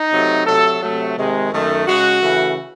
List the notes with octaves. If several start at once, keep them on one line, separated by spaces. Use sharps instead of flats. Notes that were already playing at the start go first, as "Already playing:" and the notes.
Already playing: D#4
C3 F#3 A3
C3 F#3 A3 A4
C3 F#3 A3
C3 D#3 G#3
F#2 D#3 A3
C#3 G#3 F#4
C#3 E3 A3